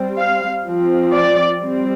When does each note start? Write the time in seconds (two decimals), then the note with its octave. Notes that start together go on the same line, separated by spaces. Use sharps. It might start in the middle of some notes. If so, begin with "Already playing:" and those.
Already playing: G3 C4
0.18 F5
0.65 F3 C4
1.13 D5
1.61 G3 C4